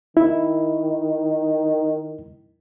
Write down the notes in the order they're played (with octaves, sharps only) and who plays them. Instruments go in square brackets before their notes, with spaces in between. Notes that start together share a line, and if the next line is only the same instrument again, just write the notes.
[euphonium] D#3 [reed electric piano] E4